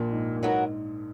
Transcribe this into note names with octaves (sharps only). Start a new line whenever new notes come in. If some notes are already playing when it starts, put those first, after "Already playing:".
Already playing: A#1 A#2
G#2
A#2
G#2 F#3 B3 F#4 A#4